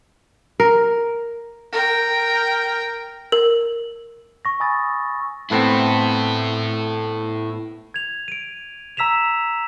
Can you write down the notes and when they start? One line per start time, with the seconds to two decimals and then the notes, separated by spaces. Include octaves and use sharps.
0.60 A#4
1.73 A#4 G5
3.32 A#4
4.45 C#6 A#6
4.60 G#5 B5 D#6 E6 A6
5.51 A2 B3 C4 E4 A4
7.94 G#6 F7
8.28 D7 D#7
8.97 A#5 E6 B6 E7 F7